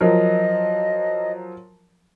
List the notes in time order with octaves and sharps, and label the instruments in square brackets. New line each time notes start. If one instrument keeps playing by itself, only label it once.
[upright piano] F3 F#3 A#4 [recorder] D#5